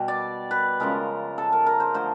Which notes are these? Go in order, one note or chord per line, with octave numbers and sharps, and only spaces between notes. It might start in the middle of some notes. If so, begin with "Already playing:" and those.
Already playing: B2 G3
D5
B4
C#3 F3 G#3 A#4
A4
A#4
A#4
C5
D3 F3 A3 C5